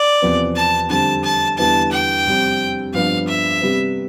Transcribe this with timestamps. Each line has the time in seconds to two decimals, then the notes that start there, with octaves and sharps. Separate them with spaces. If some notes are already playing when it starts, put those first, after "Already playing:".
Already playing: D5
0.22 E2 C3 F3 B3
0.56 A5
0.90 F2 D3 G3 C4 A5
1.24 A5
1.58 E2 D3 G3 B3 E4 A5
1.92 G5
2.27 F2 C3 G3 C4
2.93 G2 F3 B3 D4 F5
3.28 E5
3.61 C3 G3 B3